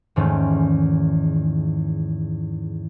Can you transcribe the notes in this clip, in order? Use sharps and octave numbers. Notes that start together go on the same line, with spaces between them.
E2 G#2 D#3 G#3 A3 C#4